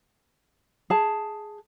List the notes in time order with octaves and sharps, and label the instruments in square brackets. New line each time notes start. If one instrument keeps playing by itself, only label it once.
[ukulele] G#4 A5